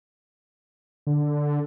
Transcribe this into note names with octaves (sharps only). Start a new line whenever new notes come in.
D3